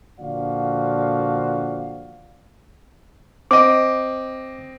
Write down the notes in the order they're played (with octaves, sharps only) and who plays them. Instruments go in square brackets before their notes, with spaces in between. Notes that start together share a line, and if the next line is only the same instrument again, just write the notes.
[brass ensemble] A#2 D3 F3 F#4 D5 F5
[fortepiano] C4 D#5 [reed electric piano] D6